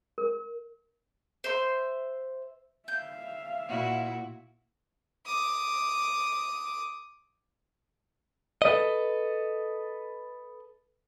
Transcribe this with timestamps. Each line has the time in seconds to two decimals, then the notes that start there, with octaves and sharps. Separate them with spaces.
0.18 A#4
1.44 C5 E5 C6
2.88 E5 F5 G6
3.68 A#2 E4 F#4
5.26 D6 D#6
8.62 A4 B4 D#5